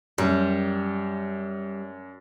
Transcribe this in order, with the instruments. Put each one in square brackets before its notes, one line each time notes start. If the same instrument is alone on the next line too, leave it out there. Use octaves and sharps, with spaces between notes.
[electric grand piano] F#2 [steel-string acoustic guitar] G3